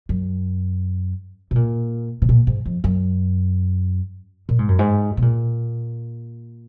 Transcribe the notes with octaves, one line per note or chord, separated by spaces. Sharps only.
F#2
B2
A#2
B2
A#2
G#2
F2
F#2
A#2
G#2
F#2
G#2
B2
A#2